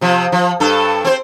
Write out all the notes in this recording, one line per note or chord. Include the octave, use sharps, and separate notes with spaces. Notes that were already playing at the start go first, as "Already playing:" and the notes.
C3 F3
F3
G2 A4
C4 C5